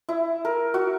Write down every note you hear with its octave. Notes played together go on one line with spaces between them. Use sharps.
E4
A#4
F#4